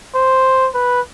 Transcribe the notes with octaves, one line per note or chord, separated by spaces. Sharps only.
C5
B4